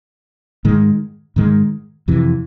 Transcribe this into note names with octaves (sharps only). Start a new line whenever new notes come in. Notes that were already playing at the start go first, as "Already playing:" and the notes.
G#2 D#3 G#3
G#2 D#3 G#3
F2 C3 E3